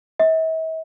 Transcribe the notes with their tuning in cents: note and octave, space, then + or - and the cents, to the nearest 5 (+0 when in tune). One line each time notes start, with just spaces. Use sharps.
E5 -45